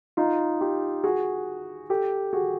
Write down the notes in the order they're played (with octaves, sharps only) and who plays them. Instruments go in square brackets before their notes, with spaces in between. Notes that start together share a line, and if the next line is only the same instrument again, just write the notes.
[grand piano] D#4 F4
F4 G4
F#4 G#4
G4 A4
F#4 G#4